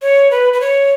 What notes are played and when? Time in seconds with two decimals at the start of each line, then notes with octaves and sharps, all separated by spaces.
0.02 C#5
0.31 B4
0.53 B4
0.61 C#5